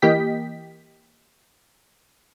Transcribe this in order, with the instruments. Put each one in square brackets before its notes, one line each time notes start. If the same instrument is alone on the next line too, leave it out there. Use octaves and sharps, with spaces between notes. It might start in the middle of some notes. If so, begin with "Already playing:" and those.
[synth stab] E3 A#3 G4 D#5 G5 B6